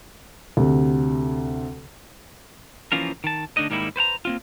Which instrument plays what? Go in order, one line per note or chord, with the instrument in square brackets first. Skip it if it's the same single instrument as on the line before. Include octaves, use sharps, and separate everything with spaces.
[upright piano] D2 C3
[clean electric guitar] E3 F3 A#3 C#4 F4 A#4
D#3 A5
D3 A3 D4 D#4 D#5
G#2 D#3 G3 A#3 D#4 E4
B4 C5 F#5 A#5
A#3 C4 F4